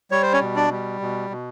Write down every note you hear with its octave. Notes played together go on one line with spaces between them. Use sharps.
G3 C#5
C5
C#4 C#5
B2
D4 D5
G3
B2
B2